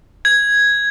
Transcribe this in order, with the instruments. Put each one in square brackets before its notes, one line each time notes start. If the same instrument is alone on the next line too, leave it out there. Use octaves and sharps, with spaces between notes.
[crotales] G#6